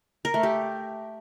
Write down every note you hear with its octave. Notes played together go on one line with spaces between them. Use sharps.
A#4
A3
G4